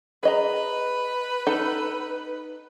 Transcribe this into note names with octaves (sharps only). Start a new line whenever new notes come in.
G#4 B4 D#5 A#5
D#4 A4